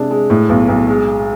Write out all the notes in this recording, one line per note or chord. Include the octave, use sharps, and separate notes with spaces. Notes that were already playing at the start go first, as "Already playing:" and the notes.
Already playing: C3 G#3 D4
G#3
A2
B1
B1
G#3